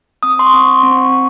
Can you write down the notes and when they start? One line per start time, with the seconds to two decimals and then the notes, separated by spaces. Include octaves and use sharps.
0.23 C4 D#6
0.39 C6
0.46 C#6
0.54 C4
0.69 C6
0.83 C4
0.91 C#6